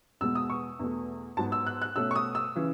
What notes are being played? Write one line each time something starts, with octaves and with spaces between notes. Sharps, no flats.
E2 B2 G#3 B3 E6
D#6
C#6
E2 B2 A3
G#2 F#3 B3 A5
E6
F#6
F#6
B2 A3 C#4 E6
C#6
D#6
E6
C#3 E3